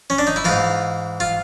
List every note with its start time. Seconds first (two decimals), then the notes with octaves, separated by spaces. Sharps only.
0.10 C#4
0.19 D4
0.27 D#4
0.36 E4
0.45 G#2 E3 F4
1.20 F4